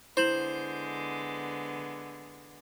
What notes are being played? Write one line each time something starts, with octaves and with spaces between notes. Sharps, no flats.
D3 G#3 B3 E4 C5 E7 F#7